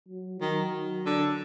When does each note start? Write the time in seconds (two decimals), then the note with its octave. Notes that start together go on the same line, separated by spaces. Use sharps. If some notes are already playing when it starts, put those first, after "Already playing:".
0.08 F#3
0.41 D#3 F#3
1.06 D3